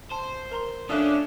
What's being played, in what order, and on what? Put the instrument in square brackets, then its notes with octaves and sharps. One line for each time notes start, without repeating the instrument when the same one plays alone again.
[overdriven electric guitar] C5 [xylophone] A5
[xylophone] A#4 A#5 C6
[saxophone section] F3 A3 D4 [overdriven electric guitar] C#4 [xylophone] D#6 E6 F#6